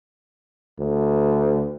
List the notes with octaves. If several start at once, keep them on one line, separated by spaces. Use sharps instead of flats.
D2